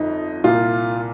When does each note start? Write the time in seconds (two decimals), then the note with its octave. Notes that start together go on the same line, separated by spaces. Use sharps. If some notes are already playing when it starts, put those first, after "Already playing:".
Already playing: G1 F2 D#4
0.44 C2 A#2 F4